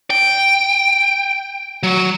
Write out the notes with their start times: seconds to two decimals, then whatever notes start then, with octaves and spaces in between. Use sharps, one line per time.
0.10 G5
1.83 F#3